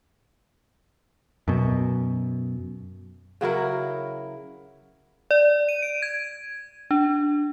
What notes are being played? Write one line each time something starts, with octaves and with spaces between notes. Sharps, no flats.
F#2 B2
C#3 F#3 E4 A#4
D5
D#7
D7
G#6
D4